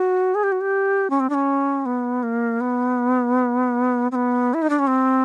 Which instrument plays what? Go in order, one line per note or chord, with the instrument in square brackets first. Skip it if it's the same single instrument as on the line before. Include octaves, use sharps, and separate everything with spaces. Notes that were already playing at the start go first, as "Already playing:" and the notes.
Already playing: [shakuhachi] F#4
G#4
G4
F#4
G4
C#4
C4
D4
C#4
B3
A#3
B3
C4
B3
E4
D#4
D4
C#4
C4